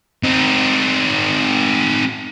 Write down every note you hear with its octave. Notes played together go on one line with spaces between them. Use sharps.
C4 D#4